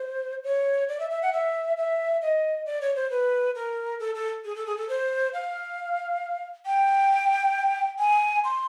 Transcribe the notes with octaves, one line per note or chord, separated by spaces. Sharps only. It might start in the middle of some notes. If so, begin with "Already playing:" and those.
Already playing: C5
C#5
D5
E5
E5
F#5
E5
E5
D#5
D5
C#5
C5
B4
A#4
A4
A4
G#4
A4
G#4
A4
C5
F5
G5
G#5
C6